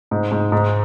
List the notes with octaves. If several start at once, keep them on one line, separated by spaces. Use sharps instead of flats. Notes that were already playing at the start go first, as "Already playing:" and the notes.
G#2
G#2
G#2